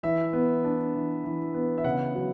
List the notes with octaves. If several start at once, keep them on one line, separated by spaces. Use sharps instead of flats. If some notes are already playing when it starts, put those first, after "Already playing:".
E3 E5
B3
D4
E3
E3
B3
E5
C#3 F#5
F#3